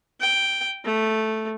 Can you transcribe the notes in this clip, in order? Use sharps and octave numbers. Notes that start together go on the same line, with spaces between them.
G5
A3